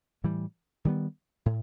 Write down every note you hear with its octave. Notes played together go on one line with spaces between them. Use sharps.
A2 E3 G3
D#3 G3 B3
A2